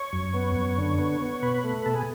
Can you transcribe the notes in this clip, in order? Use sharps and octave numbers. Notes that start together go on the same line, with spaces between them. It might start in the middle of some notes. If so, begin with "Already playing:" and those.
Already playing: C#5
F#2
B3
F#2
D3
B3
B3
B2 B4
A3
B2 A4
G#4